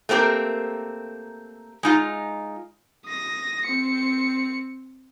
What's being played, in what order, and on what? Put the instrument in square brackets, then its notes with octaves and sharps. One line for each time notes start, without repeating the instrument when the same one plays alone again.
[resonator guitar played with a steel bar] A3 A#3 C4 G4 A#4
G#3 D#4 F4
[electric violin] D#6 A#6
C4 C#7